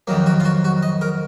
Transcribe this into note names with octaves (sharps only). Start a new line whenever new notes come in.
F2 D#3 F#3 A#3
F#4
F4
F#4
F#4
D#5
A#4